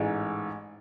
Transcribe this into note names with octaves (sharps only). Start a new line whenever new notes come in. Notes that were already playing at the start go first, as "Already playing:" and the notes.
Already playing: A1 G#2 E3 G#3